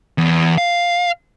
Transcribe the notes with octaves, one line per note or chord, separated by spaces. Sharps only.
E2
F5